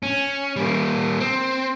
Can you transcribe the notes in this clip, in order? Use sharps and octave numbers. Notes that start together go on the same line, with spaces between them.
C#4
G3 A#3
C4